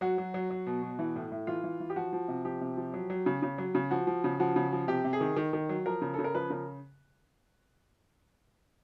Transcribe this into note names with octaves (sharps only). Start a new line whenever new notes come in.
F#3 F#4
F#3
F#3
F#3
B2
B2
E3
A2
A2
E3 F4
E3
E3
G4
F3 F#4
F3
C3
F3 G4
C3
F3
F#3
F#3
C#3
C#3
F#3
C#3
F3 F#4
F3
C#3
F3 F#4
C#3
F3
C3 G4
C3
G#4
D#3
D#3
D#3
F#3
F3 A#4
C#3
C#3 A4
A#4
F3 B4
C#3 A#4